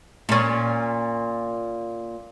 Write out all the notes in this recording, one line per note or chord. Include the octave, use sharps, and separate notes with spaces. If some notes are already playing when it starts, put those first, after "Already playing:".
A#2 C#4